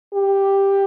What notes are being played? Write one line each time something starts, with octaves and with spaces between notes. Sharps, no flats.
G4